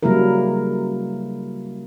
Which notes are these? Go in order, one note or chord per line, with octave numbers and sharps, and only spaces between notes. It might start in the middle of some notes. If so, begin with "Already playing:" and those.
C#3 F#3 G3 A#3 E4 A#4